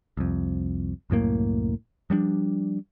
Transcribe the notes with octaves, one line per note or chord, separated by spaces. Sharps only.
C2 F2
C2 F#2 A2 A#3
F3 G3 B3 D4